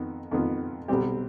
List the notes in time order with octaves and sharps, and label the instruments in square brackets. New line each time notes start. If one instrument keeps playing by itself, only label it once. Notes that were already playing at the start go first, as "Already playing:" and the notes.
Already playing: [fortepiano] F2 D#3 B3
F2 D#3 B3 F4
B1 B2 G3 C4 G4